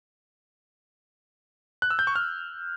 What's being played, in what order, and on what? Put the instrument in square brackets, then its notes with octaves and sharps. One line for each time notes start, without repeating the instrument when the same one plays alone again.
[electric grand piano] F#6
E6
G6
C#6
F6